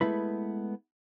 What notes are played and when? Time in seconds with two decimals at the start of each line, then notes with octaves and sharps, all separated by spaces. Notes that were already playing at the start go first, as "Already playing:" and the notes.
0.01 G#3 A3 B3 E4 B4